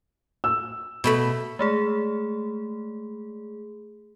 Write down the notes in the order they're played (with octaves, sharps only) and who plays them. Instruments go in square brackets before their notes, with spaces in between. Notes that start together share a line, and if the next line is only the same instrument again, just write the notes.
[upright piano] E6
[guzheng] B2 A3 B5
[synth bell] G#3 A3 G#4